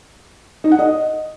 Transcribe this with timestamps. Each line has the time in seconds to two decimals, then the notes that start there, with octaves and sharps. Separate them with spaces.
0.64 D#4
0.71 F#5
0.79 D#5